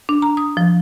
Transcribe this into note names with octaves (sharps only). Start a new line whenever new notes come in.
D4
A#5
D#6
F3